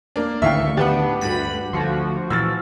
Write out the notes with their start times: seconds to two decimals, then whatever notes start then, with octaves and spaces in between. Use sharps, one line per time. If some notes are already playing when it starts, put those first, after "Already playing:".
0.16 A#3 D4
0.42 A1 D2 A2 D#3 E5 F5 G5 C#6
0.77 B3 D4 G4 B4 F#5
1.21 D2 G2 B5
1.73 D2 D3 F3 F#4
2.30 A#2 E3 E6 F6 A6